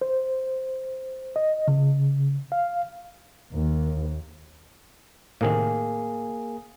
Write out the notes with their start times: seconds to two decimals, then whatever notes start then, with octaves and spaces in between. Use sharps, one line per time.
0.01 C5
1.36 D#5
1.68 C#3
2.52 F5
3.54 D#2
5.41 A2 C3 D#3 A#3 G#4